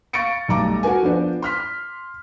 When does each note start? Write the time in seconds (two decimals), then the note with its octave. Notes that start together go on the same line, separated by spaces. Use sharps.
0.13 F5 C#6 A6 A#6 C#7 D7
0.48 B1 G3 A3 A#5 D6
0.83 F#4 A4 A#4 G#5
1.02 F3 B3 D4 C5 D5
1.42 C6 F6 B6